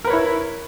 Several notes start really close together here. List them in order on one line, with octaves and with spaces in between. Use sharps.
A#4 B4 C#5 E4